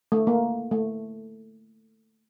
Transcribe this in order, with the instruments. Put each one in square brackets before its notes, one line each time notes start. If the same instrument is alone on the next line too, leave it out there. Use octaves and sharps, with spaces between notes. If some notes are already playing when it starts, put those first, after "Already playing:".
[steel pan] A3
A#3
A3